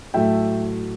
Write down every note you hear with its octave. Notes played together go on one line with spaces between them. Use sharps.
A2 F#3 A3 E5 G5